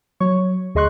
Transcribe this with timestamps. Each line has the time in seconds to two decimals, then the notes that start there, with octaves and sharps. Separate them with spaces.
0.20 F#3 C#5 C#6
0.75 D2 G#4 D#5 C6 C#6 F#6